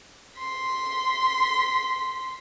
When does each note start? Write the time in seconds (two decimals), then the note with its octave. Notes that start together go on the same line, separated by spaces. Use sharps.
0.38 C6 B6